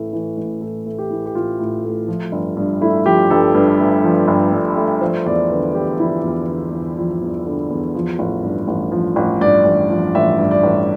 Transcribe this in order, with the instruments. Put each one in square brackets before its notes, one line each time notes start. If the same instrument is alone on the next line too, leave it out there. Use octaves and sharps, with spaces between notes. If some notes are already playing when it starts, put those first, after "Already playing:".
Already playing: [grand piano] A1 A2 E3 A3
E3
A1
A2 A4
A3
G4
E3
G4
A1 F4
A2
A3
F3
G1
G2
A3 E4
F3 G4
G1 A4
G2 B4
A3
F3
G1
G2
A3
F3 C5
E2 D5
D3 B4
E2 G4
F3 E4
E2 F4
D3
E2
F3
E2
D3
E2
F3
A1
G2
A1
F3
A1
G2 D5
A1
F3
A1 E5
G2
D5
A1